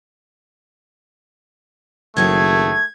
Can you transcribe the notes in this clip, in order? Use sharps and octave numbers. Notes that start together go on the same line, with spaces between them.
F#1 D#3 F#3 A3 G#4 G#6